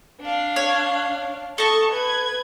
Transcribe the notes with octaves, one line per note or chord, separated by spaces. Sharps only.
D4 F5
C#5
A4 D#5 A5 C#6
B4 G#6